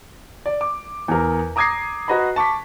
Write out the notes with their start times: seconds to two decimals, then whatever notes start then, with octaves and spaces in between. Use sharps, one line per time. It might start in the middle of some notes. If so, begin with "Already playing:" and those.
0.46 D5
0.61 D6
1.08 E2 A#4
1.56 A#5 D6 D#6 G#6 A#6 C7
2.08 F#4 B4 D#5 A#5 B5
2.36 A5 C#6 D6 B6